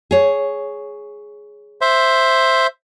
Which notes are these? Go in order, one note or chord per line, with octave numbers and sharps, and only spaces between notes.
G#4 C#5
C5 E5